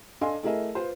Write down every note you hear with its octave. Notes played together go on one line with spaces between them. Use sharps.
D4 A4 D#5 F5 G#5 C6
A3 E4 G#4 A#4 D#5 E5
F4 B4 C5